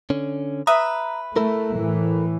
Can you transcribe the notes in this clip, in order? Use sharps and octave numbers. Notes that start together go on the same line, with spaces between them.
D3 C#4
B4 E5 A#5 D#6
A3 E4 A4 A#4
A2 E3